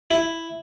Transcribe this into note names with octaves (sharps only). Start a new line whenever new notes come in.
E4